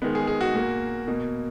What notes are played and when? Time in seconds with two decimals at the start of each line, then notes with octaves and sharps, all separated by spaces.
0.02 D#3 G#3 B3
0.15 G#4
0.27 G#4
0.41 F#4
0.55 A#2 A#3
1.07 B2 A#3